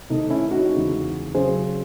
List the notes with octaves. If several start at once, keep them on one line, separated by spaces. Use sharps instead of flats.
C3 D#3 A3 D#4
C#4 E4
D#4 F#4
E2 C#3 G#3 C4
C#3 F#3 C#4 G#4 C5